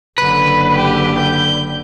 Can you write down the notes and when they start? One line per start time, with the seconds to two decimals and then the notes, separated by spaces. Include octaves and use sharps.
0.18 F#1 D3 B4
0.75 G4
1.18 G6